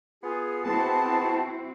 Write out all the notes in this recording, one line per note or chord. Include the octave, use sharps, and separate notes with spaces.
B3 F4 G#4
B3 C4 E4 F#4 G#4 A5